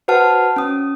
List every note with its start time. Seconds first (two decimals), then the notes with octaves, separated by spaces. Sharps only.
0.08 F#4 B4 C5 F#5 A5 F6
0.56 C#4 D#6